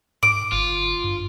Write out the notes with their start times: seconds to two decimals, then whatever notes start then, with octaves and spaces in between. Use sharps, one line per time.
0.23 G#2 D6
0.52 G1 F4
1.04 G2